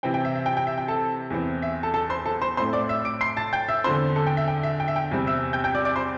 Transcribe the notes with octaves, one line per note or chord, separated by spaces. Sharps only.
C3 E3 C4 G5
G5
E5
E5
G5
G5
E5
G5
A4 A5
E2 E3 C4
E5
A4 A5
A4 A5
C5 C6
A4 A5
C5 C6
A2 A3 C4 C5 C6
D5 D6
E5 E6
D6 D7
C6 C7
A5 A6
G5 G6
E5 E6
E2 D3 C4 C5 C6
A4 A5
G5
E5
G5
E5
G5
E5
G5
E2 C3 G3 C4
E5 E6
G5 G6
G5 G6
D5 D6
D5 D6
C5 C6